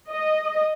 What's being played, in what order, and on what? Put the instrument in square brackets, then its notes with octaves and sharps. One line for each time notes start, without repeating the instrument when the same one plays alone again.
[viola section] D#5